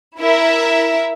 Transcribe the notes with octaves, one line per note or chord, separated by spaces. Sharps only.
E4 A#4 E5